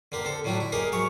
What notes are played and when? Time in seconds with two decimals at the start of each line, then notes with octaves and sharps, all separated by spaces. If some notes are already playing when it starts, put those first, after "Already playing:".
0.12 D3 A#3 G4
0.25 C4 A4
0.44 A2 D3 F#3 G3 D4 E4
0.60 E4
0.72 A#3 D#4 G4 G#4 A#4
0.92 G#2 F#3 C#5 C#6